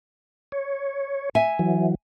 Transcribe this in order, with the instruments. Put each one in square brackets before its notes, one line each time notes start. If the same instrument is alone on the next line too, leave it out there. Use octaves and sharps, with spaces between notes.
[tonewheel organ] C#5
[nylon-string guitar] E5 G#5
[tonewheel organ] E3 F#3